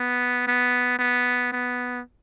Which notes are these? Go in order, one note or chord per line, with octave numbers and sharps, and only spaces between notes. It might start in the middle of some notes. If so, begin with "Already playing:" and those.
Already playing: B3
B3
B3
B3